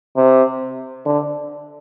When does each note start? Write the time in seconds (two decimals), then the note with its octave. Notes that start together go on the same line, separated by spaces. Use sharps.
0.16 C3
1.06 D3